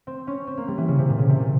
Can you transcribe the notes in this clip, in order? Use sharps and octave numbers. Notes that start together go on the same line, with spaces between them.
C4
C#4
C4
A#3
G3
E3
C#3
C3
A#2
C#3
C3
A#2